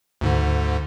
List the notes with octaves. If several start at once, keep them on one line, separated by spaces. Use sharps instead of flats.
D2 G#2 D3